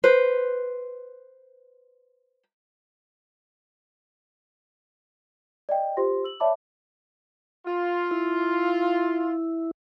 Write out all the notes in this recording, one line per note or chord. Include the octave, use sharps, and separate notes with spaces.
B4 C5
D5 D#5 G5
F4 G4 C5 C6 A#6
E6 F#7
C#5 D5 E5 A5 B5 D6
F4
E4